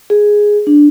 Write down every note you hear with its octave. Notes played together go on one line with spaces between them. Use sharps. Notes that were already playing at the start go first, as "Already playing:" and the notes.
G#4
D4